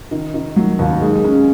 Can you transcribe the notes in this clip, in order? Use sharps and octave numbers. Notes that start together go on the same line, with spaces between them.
D#3
D#3
F#3
D#2
G#3
C#4